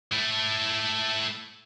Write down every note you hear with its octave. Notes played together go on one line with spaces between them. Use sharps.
A3 E4